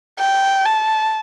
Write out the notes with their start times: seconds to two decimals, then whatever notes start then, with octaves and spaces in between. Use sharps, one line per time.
0.19 G5
0.65 A5